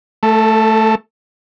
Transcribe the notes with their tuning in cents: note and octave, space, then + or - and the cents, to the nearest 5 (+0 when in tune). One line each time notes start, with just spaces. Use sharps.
A3 +0 A4 +40